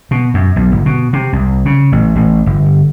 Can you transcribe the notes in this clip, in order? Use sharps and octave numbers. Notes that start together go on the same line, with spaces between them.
B2
F#2
B1
G1
B2
C3
C2
C#3
A1
A1
G1